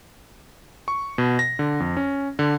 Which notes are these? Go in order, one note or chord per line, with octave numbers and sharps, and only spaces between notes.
C#6
B2
A#6
D3
F2
C#4
D3